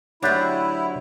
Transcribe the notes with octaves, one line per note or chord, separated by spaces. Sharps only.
D2 F#3 D4 E4 G4